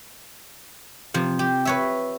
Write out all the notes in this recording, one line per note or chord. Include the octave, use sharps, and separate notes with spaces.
C3 F3
G4
B4 C#5 E5